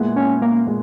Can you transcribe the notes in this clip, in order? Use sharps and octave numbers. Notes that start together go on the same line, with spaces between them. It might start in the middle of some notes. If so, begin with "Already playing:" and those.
Already playing: A#2 G#3 B3 E4
C#4
A#3
A#2 G#3